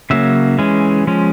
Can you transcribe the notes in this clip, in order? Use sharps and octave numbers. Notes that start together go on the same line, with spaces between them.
C#3 F#3 A#3 C#4 E5
E3 G#3 C#4
F3 G#3 C#4